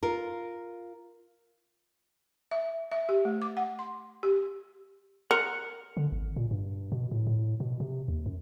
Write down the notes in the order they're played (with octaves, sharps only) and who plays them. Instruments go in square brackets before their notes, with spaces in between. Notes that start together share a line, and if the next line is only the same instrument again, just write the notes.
[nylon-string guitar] F4 A#4
[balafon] E5
E5
G4
A3
D6
F#5
C6
G4
[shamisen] A#4 [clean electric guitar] F#5
[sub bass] D3
G#1
A#2
G2
B2
A2
A2
B2
C3
D#2
F#2